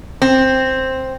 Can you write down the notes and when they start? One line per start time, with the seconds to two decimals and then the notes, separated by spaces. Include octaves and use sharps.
0.22 C4